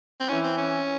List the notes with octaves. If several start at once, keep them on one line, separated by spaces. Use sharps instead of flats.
C4
E3 C#4
C4
C#4